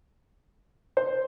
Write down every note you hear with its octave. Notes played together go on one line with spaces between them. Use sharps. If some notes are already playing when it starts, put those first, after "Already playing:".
C5